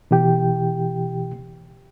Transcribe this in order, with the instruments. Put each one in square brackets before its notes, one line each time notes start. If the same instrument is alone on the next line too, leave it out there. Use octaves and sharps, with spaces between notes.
[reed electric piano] B2 E3 G4 G5